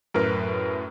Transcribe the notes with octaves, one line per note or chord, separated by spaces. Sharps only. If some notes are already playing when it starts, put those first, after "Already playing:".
F#2 A2 A#4 B4